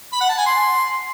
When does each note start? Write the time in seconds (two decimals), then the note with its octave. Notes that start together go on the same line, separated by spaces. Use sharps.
0.13 B5
0.21 F#5
0.29 A5
0.38 G#5
0.46 C6